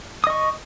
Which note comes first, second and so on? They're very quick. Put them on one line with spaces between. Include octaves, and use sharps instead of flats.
D#6 D#5 C#6